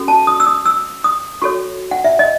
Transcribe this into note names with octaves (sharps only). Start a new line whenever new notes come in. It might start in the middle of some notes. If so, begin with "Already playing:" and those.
Already playing: C#4 F#4 A4
A5
D#6
E6
D#6
E6
D#6
F#4 A4 C#5 C#6
F#5
E5
D#5